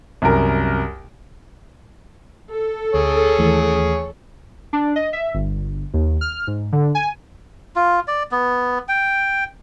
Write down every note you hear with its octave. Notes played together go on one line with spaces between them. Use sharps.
C2 F#2 A#4
A4
D2 G#4 C#5
D#2 E3 A3
D4
D#5
E5
G1
D#2
F6
G#2
D3
G#5
F4
D5
B3
G5